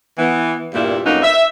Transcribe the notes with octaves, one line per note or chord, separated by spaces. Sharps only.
E3 B3
E2 G2 A#2 G3 A#3 E4
F2 F#3 A#3 B3 C#4 D#4
E5